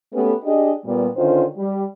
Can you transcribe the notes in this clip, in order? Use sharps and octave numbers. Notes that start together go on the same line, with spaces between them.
A3 B3 C#4 G4 A4 B4
D4 G4 G#4 D#5
A#2 G3 B3
D3 D#3 C#4 F4 C5
G3